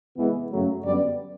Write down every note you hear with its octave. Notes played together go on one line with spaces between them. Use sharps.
E2 C3 E3 G#3 B3
F#2 C#3 F#3 A3
F#2 D3 G3 B3 D5